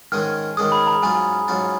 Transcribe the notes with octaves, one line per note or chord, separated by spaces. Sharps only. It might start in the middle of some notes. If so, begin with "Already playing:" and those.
G#2 D#3 G#3 C#4 G#4 F6
G#2 D#3 G#3 C#4 G#4 D#6
B5
A#5
G#2 F#3 C#4 F4 G#5
G#2 F#3 C#4 F4